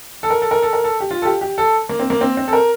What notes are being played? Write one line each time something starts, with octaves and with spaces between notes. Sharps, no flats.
A4
A#4
A4
A#4
A4
A#4
A4
G4
F4
A4
G4
G4
A4
A#3
C4
A#3
C4
C4
A4
A#4